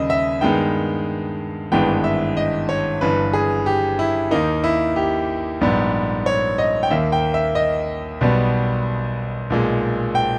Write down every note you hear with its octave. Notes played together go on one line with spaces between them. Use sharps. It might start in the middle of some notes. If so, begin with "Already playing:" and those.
Already playing: D#2 C#3 G3 D#5
E5
G2 D#3 G#3 B3 G5
G#1 G2 E3 G#3 B3 G5
E5
D#5
C#5
G1 G2 E3 B4
G#4
G4
E4
D#2 D#3 A#3 D#4
E4
G4
A#1 G#2 G3 B3
C#5
D#5
G5
D#2 D#3 A#3 E5
G5
E5
D#5
B1 B2 G3 B3
B1 A#2 G#3
G5